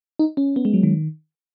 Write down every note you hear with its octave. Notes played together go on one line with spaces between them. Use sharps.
D#4
C#4
B3
G#3
F#3
D#3